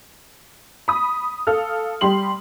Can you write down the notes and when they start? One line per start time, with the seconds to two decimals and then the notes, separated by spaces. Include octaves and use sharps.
0.88 B5 D#6
1.47 A4 F5 F6
2.01 G3 G4 C6 F#7